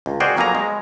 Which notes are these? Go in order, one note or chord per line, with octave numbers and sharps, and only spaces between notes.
C#2
F#4 G#4 A#4 C5 D5 G5
F2 F#3 A#3 B3 G#5 A#5
G#3